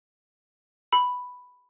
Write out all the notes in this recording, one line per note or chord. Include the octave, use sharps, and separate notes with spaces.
B5